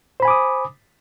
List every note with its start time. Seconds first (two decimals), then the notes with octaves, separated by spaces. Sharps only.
0.20 C5
0.22 B5
0.25 G#5
0.28 D6
0.30 D#6